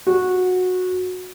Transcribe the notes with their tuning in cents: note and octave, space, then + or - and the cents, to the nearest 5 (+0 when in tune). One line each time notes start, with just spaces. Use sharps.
F#4 -15